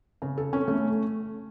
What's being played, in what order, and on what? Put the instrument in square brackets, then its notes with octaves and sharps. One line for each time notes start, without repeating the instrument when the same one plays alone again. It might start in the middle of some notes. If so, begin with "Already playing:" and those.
[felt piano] C#3
A4
C#4
A3